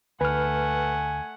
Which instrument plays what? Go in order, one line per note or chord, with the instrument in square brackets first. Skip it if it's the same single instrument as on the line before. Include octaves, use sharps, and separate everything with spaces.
[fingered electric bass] D2 [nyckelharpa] A3 F#5 [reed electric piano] B4 F6 [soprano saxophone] G#5